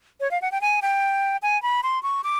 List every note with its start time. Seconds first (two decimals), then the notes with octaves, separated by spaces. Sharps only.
0.21 C#5
0.31 F5
0.42 F#5
0.52 G5
0.61 G#5
0.82 G5
1.42 G#5
1.63 B5
1.83 C6
2.03 C#6
2.24 D6